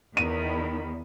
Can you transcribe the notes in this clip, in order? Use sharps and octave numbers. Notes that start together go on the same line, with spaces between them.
E2 D#3 B5 D#7